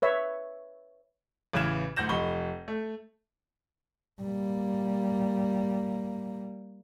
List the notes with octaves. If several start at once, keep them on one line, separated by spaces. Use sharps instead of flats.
B4 C#5 E5
A1 C#3 E3 F6 G#6 E7
D1 D2 F#5 G6 A#6 E7
F1 D#5 B5 C#6 G7
A3
G3 A#3